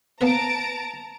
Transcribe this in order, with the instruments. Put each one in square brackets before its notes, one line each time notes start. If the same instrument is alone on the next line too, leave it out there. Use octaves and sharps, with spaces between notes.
[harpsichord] A#3 B3 B4 [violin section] A5 A#5 D7